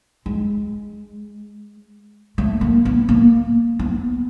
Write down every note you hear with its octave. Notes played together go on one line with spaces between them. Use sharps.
G#3
A3
A#3
B3
A#3
B3